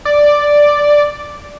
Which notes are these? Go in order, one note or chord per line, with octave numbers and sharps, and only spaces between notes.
D5